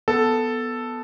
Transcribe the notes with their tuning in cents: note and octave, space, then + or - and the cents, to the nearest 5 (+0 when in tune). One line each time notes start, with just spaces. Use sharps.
B3 +0 A4 +0